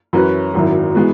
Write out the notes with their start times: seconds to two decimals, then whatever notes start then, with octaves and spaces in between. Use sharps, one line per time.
0.13 F#2 E3 C#4 F#4 B4
0.54 G#1 F#2 F#3 E4
0.95 E3 G#3 B3 F#4